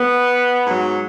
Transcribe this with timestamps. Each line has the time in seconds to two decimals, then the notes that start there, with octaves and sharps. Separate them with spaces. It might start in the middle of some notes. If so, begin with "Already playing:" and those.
Already playing: B3
0.67 G#2 F#3